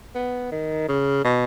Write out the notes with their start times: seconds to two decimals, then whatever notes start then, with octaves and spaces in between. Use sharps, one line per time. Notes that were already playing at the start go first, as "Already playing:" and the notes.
0.15 B3
0.51 D#3
0.88 C#3
1.24 B2